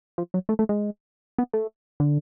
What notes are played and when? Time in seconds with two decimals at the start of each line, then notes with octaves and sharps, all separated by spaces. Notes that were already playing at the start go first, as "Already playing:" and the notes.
0.18 F3
0.34 F#3
0.49 A3
0.59 A3
0.69 G#3
1.38 B3
1.53 A3
2.00 D3